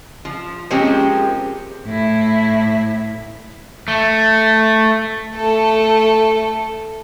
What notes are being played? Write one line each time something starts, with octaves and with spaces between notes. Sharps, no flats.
F3
F3 G#3 A#3 C4 C#4 G4
A2 E4
A3
A3 A4